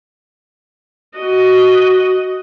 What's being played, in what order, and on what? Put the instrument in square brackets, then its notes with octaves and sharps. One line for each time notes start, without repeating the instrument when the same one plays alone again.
[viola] F#4 D#5